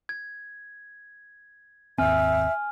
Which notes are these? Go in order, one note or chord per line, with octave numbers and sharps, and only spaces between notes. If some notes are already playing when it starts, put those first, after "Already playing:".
G#6
G#1 D#2 C4 E5 G#5 F6